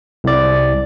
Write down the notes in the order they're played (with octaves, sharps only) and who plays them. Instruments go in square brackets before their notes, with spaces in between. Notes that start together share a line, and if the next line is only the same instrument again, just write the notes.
[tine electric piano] C2 D5